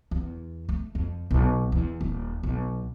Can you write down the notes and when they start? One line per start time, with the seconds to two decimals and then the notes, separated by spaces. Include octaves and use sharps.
0.11 E2
0.69 A3
0.95 F2
1.31 B1
1.72 E2
2.01 D#1
2.43 B1